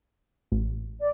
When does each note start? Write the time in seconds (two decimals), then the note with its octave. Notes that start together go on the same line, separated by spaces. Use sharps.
0.52 A1
1.00 D5